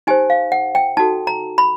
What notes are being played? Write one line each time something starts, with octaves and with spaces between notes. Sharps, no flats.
D#4 G4 C5 G#5
F5
F#5
G5
D#4 F#4 A4 A5
A#5
B5